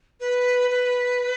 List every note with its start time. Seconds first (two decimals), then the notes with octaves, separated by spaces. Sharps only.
0.20 B4
0.70 B4